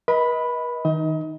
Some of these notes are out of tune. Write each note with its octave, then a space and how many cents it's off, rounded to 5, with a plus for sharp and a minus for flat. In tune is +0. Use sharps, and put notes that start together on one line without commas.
B4 -40 D#5 +30 B5 +0
D#3 +20 D#4 -5 D#5 +35